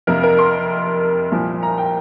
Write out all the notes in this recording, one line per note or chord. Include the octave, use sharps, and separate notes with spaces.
F2 C3 A#3 A#4
A#4
C6
C2 A#2 F3 A#3
A#5
G5